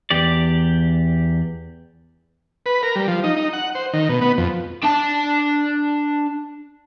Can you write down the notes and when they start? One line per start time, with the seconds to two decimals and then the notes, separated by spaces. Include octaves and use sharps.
0.10 E2 G4 D5
2.66 B4
2.83 A#4
2.96 G3
3.08 F3
3.24 D#4
3.36 D#4
3.53 F#5
3.75 C5
3.93 D#3
4.09 B2
4.21 B3
4.37 F2
4.83 D4 A5